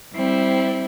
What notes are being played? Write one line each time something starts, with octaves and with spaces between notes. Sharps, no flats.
G3 C4 E4